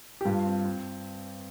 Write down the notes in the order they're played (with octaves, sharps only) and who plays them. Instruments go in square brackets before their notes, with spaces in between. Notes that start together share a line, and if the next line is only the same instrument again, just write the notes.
[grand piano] G4
G2 F4
C4
C4